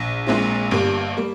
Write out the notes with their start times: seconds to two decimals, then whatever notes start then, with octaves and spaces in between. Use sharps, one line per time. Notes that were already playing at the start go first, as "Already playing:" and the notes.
Already playing: A#1
0.27 A#1 A#2 G#3 C4 E4
0.71 G1 G2 G3 A#3
1.17 G3 A#3